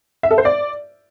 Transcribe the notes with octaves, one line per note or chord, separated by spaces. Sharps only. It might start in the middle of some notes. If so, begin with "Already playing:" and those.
E5
A4
C5
D5